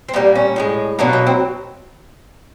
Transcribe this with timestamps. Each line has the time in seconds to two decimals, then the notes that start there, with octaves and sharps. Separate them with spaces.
0.09 C4
0.13 A#2 G3 A#3 B3
0.35 C#4
0.56 A2 E3 G#3
0.99 B2 F#3 A#3 D4
1.13 D#4
1.27 C4